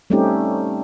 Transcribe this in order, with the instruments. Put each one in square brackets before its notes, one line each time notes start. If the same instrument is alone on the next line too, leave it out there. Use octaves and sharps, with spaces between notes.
[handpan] G3 A3 C4 C#4 D#4 G4